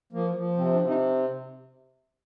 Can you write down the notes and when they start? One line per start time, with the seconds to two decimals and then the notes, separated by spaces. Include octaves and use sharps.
0.13 F3 A#3
0.35 F3
0.57 C3 C4
0.73 D4
0.81 C3
0.88 D#4